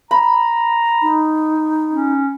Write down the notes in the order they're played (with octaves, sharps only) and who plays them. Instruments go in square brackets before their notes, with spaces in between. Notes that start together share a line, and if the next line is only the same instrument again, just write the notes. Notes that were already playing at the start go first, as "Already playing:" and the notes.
[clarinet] A#5 [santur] B5
[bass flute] D#4
[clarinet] C#4